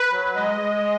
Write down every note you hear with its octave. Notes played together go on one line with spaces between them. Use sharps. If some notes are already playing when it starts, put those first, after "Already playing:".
Already playing: B4
F#3
G#3 D#5
G#3